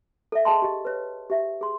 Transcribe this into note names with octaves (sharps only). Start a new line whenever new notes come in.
A4 D5 E5
G#4 D#5 A5 C6
G4 D#5
B4 C#5
G4 E5
G#4 C6